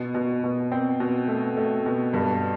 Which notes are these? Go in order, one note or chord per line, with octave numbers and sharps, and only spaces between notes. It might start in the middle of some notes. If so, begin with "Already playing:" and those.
Already playing: B2
B2
B2
C4
B2
A3
A3
B2
G2